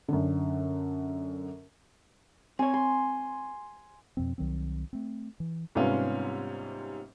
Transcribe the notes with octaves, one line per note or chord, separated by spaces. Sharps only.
F#2 D3
C4 C#5 G#5
C6
F2 B2 F3 C4
C2 D#3 F#3 C4
A3 C4
E3
G#2 C3 G3 B3 C#4 F4